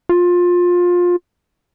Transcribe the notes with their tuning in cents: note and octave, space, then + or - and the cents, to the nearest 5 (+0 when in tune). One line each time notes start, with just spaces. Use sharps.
F4 +20